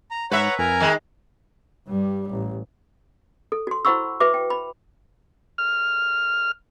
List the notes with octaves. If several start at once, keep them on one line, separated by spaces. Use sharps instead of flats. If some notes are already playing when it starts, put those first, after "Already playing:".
A#5
G#2 B4 C#5 E5 F#5 A#5
F2 A#4 G#5 A#5
D#3 G#3
G2 G3
A1
A4
F#4 C6
E4 C5 F#5 B5 C#6 E6
F#4 B4 E5 D6
G5
B5
F6